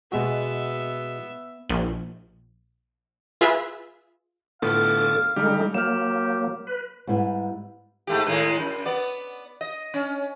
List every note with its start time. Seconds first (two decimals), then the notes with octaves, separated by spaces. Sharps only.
0.12 B2 G#3 B3 F#4 E5
1.70 A#1
3.41 F4 G#4 B4 E5
4.62 A2 D3 B3 F4 A4 F5 D6
5.36 D3 G3 G#3 D#4 G4
5.74 F#3 A#3 G4 F6 E7
6.67 B4
7.07 G#2 G3 B3 E4
8.07 G#2 A3 G4
8.26 A2 D#3 G#3
8.59 F#2
8.85 B3 D5
9.61 D#5
9.94 C#4